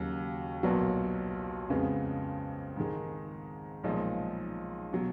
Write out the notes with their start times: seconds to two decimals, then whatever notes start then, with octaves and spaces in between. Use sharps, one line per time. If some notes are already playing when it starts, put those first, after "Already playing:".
Already playing: D#2 C#3 F#3
0.63 B1 A#2 F#3 B3 F#4
1.70 F2 C#3 G#3 B3
2.77 G#2 D#3 G#3
3.84 B1 A#2 F3 G#3 D#4
4.93 B2 F#3